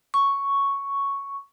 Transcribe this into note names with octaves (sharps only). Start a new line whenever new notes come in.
C#6